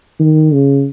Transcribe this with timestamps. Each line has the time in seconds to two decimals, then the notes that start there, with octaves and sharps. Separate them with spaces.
0.19 D#3
0.53 C#3